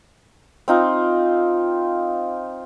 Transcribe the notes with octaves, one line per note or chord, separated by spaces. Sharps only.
C4 D#4 F4